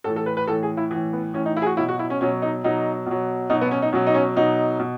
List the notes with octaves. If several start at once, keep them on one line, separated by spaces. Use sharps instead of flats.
A2 E3 A4
A4
B4
B4
A2 E3 A4
G#4
E4
A2 E3
B3
A2 E3 C#4
D#4
E4
G#4
F#4
B2 F#3 E4
F#4
E4
C#4
B2 F#3 C#4
D#4
B2 F#3 D#4
B2 F#3
B2 F#3 D#4
B3
C#4
D#4
B2 F#3 C#4
D#4
C#4
B2 F#3 D#4
B2